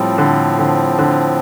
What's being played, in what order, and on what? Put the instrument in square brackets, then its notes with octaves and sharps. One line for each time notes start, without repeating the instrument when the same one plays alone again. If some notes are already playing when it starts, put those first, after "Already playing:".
Already playing: [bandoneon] A2 F3 C4 [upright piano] G3
[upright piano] D3
D3
D3